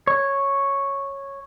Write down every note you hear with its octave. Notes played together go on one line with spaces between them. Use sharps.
C#5